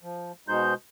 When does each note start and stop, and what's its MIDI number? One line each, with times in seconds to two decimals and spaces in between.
0.03 0.32 53
0.48 0.74 47
0.48 0.74 56
0.48 0.74 63
0.48 0.74 72
0.48 0.74 91